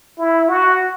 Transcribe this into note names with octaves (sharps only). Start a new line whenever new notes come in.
E4
F#4